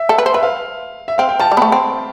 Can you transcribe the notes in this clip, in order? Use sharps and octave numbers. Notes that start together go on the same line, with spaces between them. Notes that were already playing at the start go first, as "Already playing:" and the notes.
Already playing: E5
A4
B4
C5
B4 E5
F5
E5
C4 F5
G5
F3 A5
G3
B3 B5
A3
C4